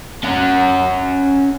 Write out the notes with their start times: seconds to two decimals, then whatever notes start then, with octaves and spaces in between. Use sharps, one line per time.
0.24 C#4 F#5